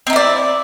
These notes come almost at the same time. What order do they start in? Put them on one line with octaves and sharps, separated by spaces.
C4 D#4 E4 D5